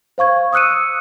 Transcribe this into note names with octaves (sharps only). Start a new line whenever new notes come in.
C5 F5 C#6 G#6
D#6 E6 F#6 C#7 D#7